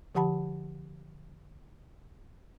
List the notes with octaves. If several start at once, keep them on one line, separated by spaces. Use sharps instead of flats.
D3 F3 G4 F#5 A5 B5